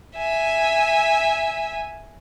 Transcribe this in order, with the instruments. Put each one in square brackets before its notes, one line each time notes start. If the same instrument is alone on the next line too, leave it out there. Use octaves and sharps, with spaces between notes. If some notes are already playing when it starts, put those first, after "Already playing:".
[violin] E5 G#5